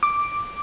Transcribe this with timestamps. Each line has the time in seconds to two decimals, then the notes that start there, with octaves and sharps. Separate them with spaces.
0.03 D6